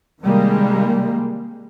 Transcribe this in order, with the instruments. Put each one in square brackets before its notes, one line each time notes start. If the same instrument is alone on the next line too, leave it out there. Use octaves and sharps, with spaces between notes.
[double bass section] C3 D#3 G3 G#3 A#3